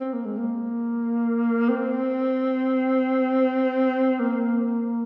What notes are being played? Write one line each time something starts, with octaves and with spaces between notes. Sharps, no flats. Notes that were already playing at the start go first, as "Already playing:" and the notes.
C4
A#3
G#3
A#3
C4
A#3